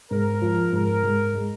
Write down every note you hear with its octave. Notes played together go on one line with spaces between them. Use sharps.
G#2 A#4
F3
G#2 A#4
G#2
G#3